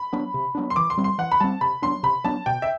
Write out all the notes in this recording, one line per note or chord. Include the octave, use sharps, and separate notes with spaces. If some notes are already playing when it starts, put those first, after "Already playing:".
Already playing: B5
F#3 B3 D4
C3
F#3 B3 D4
C6
E3 D6
C6
G3 C4
C6
E3 F#5
B5
G3 C4 A5
C3 B5
F#3 B3 D4 C6
C3 B5
F#3 B3 D4 A5
B2 G5
E5